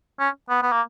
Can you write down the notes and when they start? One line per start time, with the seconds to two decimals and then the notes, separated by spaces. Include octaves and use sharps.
0.20 C#4
0.49 B3
0.63 B3
0.72 A#3